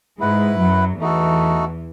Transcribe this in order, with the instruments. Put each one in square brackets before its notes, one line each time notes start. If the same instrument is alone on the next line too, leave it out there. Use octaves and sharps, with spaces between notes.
[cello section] G#2 G#3 [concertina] E4 B4 F#5
[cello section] F#2 F#3
[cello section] E2 E3 [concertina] A3 D#4 F#4 A4